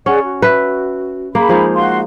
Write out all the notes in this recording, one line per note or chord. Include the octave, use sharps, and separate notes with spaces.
C#4 G#4 D5 F#5
F#4
B4 E5
A#3 G#4 B5
F3 G#3 D#4
F#4 F5 C6